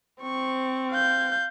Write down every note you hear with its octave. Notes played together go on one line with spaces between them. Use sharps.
C4 C#6
F5 G6